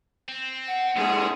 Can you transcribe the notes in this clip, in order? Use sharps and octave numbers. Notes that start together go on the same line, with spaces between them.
C4
F#5
A#2 G#3 A3 G#4